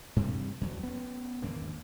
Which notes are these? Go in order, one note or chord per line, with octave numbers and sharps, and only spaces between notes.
G2 C3 E3 G3
E2 F#3
B3 C#4
G#1 E2 D3 A#3